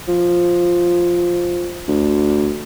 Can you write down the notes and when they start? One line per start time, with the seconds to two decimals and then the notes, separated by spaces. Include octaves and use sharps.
0.08 F3
1.88 D2